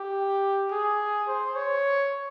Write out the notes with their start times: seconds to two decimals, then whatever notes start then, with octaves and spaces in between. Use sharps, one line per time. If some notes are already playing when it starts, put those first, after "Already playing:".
Already playing: G4
0.71 G#4
1.28 C5
1.56 C#5